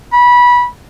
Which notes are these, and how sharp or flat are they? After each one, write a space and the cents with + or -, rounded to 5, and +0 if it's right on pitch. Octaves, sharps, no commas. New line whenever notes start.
B5 -20